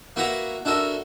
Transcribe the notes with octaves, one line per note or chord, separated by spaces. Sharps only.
A#3 E4 F#4 B4 F#5 A#5
D4 E4 F#4 A4 A#4